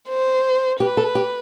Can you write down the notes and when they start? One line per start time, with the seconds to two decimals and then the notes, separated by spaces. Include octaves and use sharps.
0.09 C5
0.80 G4 B4
0.97 A4
1.15 G4